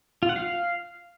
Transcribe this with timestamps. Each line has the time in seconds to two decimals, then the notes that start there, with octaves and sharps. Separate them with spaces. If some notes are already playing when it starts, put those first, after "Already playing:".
0.23 F4
0.29 F#5
0.36 F5